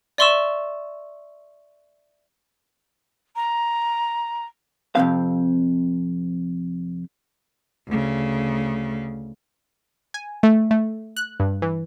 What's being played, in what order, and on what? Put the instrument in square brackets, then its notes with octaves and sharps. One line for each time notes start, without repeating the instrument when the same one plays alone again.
[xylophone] D5 E5 C6 C#6 E6 E7
[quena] A#5
[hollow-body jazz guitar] F2 C3 E3 C4 F5
[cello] D2 C#3
[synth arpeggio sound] G#5
A3
A3
F#6
G2
E3